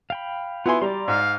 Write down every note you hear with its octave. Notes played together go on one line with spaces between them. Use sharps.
F5 G5 B5
B3 E4 F4 G#5 C6
G3 D5 A#5 C6
G#2 F5